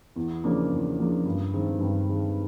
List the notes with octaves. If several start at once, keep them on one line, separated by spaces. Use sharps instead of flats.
E2
C#3 F3 A#3 D4
E2
C#3 F3 A#3 D4
G2
D#3 G#3 C4
G2
D#3 G#3 C4